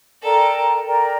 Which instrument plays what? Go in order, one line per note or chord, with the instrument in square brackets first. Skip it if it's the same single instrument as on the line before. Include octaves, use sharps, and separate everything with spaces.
[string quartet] A4 [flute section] A#4 D5 G5 A#5
[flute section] A#4 D5 G5 A#5